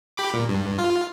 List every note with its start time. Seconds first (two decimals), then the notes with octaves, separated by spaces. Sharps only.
0.17 G4 B5 D6
0.34 A#2
0.49 G2
0.78 F4